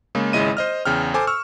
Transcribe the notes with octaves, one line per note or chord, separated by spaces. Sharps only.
C#3 G#3 A#3
G#1 C#3 G#3 E4 D#5 D#7
C5 D#5 F6
E2 C#3 G5 F6
A4 C5 G#5 D6
C#6 E6 F6